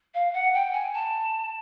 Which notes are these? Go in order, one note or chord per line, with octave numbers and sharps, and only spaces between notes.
F5
F#5
G5
G#5
A5